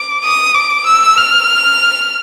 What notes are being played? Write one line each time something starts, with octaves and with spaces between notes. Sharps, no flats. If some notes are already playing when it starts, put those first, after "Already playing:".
Already playing: D6
D#6
D6
E6
F6